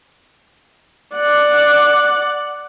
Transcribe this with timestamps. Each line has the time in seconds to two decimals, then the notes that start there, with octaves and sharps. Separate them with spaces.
1.16 D5 F#5